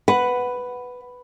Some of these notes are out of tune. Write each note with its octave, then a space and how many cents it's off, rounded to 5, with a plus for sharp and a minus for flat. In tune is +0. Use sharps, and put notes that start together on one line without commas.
B4 +5 F#5 +0